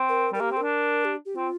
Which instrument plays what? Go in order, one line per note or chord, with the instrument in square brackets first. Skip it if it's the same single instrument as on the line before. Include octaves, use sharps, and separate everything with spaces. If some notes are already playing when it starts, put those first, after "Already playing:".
Already playing: [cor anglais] C4
[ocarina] A#4
[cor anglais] G3 [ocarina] A#4
[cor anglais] A#3 [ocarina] G4
[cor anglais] C4
[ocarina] A#4
[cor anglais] D4
[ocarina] G4
G4
[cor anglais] C4 [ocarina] F4